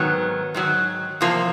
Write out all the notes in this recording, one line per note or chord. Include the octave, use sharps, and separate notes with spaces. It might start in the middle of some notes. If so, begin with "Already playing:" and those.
Already playing: G#2 D#3 F#3 B3
G#2 D#3 F#3
E2 C3 F3 A#3